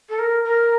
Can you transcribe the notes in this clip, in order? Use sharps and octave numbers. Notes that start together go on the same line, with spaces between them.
A4
A#4
A#4